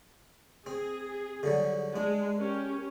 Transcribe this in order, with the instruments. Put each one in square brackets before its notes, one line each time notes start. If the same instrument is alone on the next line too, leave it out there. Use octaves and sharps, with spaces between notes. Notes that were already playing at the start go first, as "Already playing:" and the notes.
[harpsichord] C4 [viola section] G#4
[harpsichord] D3 F#3 G3
[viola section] G#3 [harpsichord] D4
[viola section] C#4 G4 A#4